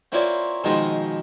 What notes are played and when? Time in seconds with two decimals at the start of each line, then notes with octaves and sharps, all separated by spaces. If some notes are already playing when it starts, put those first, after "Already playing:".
0.12 A#3 C4 E4 F4 C#5 D5
0.64 B2 D#3 F3 G#3 C4 D#4